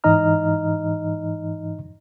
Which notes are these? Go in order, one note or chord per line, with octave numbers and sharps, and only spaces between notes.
G#2 E3 D#4 D#5 A#5 F6